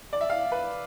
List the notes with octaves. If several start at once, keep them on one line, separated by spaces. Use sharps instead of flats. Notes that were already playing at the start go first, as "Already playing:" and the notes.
D5
E5
F5
B4